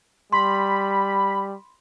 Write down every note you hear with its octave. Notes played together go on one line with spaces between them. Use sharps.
G3 B5 C6